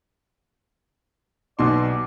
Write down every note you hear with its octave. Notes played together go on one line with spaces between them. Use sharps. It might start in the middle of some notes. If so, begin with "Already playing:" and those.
B1 B2 D5 C6